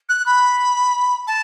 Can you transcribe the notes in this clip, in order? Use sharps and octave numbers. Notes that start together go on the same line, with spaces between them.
F#6
B5
A5